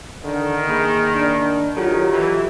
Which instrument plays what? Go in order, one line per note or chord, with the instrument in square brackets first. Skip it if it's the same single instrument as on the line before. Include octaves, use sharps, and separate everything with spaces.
[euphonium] D3 [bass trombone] D#3
[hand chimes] A#3 B5 [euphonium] G#4
[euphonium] D4
[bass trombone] D#3 [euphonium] F#3 [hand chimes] F4 G4 A4
[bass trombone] E3